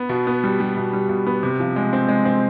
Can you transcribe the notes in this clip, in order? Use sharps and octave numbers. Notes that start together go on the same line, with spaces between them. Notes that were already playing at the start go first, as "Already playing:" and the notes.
Already playing: B3
B2
B3
G3
G3
B2
G3
B2
B3
C3
F3
G#3
C4
G#3
C4